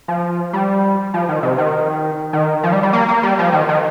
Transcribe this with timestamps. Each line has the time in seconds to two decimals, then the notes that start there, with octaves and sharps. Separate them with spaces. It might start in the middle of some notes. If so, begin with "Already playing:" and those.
0.08 F3
0.53 G3
1.14 F3
1.29 D#3
1.43 C3
1.58 D#3
2.33 D#3
2.63 F3
2.73 G3
2.83 G3
2.93 A#3
3.09 A#3
3.23 G3
3.39 F3
3.53 D#3
3.69 D#3